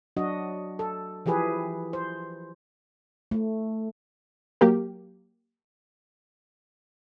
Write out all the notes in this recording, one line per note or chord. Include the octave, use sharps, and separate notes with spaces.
F#3 D4 F#4 D#5
A4
E3 F3 G4 G#4 B4
C5
A3
F#3 A#3 G4 A#4